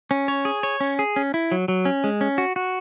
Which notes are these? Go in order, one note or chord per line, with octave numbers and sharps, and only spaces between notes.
C#4
C#5
G#4
C#5
C#4
G#4
C#4
E4
F#3
F#3
C#4
G#3
C#4
F#4
F#4